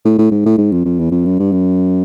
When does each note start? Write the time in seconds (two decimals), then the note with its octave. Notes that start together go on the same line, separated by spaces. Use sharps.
0.05 A2
0.19 A2
0.31 G#2
0.46 A2
0.58 G#2
0.72 F2
0.85 F2
0.99 E2
1.11 F2
1.25 F#2
1.39 G2
1.52 F#2